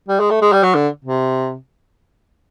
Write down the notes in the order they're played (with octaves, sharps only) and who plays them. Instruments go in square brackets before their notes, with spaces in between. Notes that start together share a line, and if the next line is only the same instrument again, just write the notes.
[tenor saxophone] G3
G#3
A3
G#3
G3
F#3
D3
C3